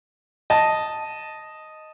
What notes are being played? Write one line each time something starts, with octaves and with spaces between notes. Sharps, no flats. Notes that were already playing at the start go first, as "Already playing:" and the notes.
D#5 A5